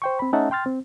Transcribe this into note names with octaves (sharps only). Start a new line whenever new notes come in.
C5 G5 C#6
C4 B5
A3 C#4 D#4 E5 F#5 A5
G5 C6 F6 A6
C4